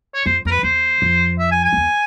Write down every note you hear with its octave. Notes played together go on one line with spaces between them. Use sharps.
C#5
F2 C5
F2 A#4
B4
E2 C5
F2
E5
G#5
G#5
F2
E2